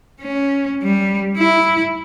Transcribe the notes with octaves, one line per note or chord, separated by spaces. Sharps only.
C#4
G3
E4